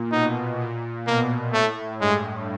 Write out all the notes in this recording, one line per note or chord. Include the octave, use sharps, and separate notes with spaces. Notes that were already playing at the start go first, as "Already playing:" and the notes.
Already playing: A#2
B2 D#4
A#2
B2 A#3
A2 A3
G2 G#3